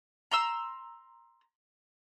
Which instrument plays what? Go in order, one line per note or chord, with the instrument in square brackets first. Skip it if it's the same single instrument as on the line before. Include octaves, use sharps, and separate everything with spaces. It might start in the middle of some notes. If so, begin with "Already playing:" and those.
[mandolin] A#5 C6 E6